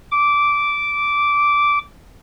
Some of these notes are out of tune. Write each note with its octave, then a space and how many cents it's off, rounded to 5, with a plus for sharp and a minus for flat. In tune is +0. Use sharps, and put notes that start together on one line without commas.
D6 -10